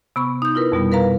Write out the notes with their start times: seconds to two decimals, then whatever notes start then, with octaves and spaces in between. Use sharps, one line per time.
0.16 C3 B3 B5 C#6
0.42 D#4 G6
0.55 E4 F4 A#4 B4
0.72 F2 B2 G3 B3
0.92 A#4 B4 F5 A#5